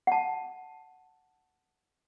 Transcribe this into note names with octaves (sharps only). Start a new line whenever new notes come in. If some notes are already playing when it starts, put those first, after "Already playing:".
F#5 A5